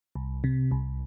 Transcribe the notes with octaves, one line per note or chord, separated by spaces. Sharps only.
C2
C3
C2